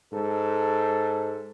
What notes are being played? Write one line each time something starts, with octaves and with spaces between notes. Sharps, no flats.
G#2 A4